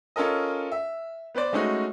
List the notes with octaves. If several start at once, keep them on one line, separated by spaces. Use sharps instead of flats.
C#4 F4 A4 A#4 D#5
E5
B3 B4 C5 D5
G#3 A3 C#4 D#4 F#4